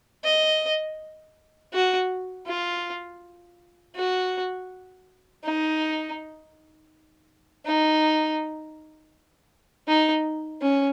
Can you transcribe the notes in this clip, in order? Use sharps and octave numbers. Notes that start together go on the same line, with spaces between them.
D#5
F#4
F4
F#4
D#4
D#4
D#4
C#4